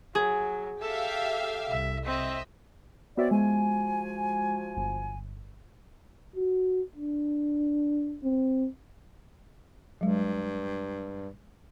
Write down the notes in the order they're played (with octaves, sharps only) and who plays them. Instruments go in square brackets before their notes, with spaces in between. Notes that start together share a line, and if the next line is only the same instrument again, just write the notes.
[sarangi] F#3 [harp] G#4
[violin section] G4 E5 F5 [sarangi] A4
[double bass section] C2 [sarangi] E5
[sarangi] C4 [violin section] D#5 E5
[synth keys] B3 F#4 E5 [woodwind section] C4 C#5 D5
[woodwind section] F3 F#4 G#5 [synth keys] G#3
[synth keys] G1
[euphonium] F#4
D4
C4
[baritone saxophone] G2 [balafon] F#3 G#3